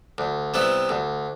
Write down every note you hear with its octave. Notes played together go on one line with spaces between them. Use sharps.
D2
C3 G3 B3 E4
D2